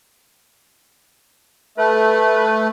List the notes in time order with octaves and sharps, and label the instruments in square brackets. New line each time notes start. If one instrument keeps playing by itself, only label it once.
[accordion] A3 [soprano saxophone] B4